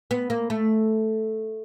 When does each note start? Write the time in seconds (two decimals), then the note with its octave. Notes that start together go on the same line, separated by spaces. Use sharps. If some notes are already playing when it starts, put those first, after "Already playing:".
0.11 B3
0.30 A#3
0.50 A3